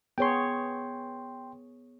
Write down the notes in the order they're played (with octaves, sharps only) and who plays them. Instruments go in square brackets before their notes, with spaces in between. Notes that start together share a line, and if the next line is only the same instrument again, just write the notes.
[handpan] B3 G#4 C#5 [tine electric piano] G5 C6